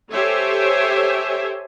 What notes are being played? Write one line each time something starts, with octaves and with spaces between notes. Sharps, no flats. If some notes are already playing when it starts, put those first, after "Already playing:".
G4 A4 C5 C#5 E5 G#5